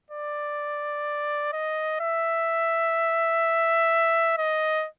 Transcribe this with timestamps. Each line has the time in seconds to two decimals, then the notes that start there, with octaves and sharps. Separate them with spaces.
0.11 D5
1.53 D#5
2.00 E5
4.38 D#5